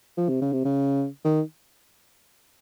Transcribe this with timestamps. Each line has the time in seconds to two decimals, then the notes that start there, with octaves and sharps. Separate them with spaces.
0.17 F3
0.29 C3
0.41 C#3
0.53 C3
0.65 C#3
1.25 D#3